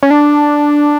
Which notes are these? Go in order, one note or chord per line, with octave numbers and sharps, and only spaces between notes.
C#4
D4